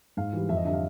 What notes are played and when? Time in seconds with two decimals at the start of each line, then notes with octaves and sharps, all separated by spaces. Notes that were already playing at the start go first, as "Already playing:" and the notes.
0.17 G#2 F5
0.33 E3 G3
0.49 F2 E5
0.57 D#5
0.65 D3 E5
0.68 G3 F5